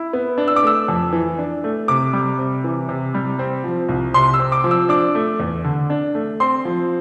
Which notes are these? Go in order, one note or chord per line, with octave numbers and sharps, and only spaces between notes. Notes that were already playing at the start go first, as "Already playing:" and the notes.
Already playing: E4
B3
D4
E6
D6
A3 E6
F2
E3
D4
A3
C3 D6
G3
C3
E3
C3
G3
C4
F3
C2
C3 C6
E6
C4
D6
F3
E6
D4 D6
A3
E2
D3
D4
A3
C4 C6
F3